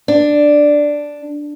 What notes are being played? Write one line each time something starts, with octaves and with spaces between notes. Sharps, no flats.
D4